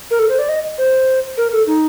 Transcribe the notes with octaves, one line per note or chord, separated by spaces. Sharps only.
A#4
A4
C5
D5
D#5
C5
A#4
A4
D#4